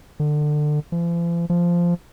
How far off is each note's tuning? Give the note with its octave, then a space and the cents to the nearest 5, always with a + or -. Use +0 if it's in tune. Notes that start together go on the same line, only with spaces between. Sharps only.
D3 +25
F3 -45
F3 -10